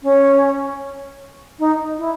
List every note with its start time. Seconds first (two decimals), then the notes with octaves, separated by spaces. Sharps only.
0.02 C#4
1.59 D#4
1.98 E4